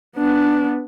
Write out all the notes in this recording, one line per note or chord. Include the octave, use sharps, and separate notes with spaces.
B3 D4